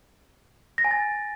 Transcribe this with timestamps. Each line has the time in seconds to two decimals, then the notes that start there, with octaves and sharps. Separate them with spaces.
0.78 A#6
0.85 G#5
0.91 A6